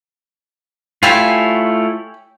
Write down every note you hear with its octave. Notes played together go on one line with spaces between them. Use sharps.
A3 E4 F4 G4 C#5 G#5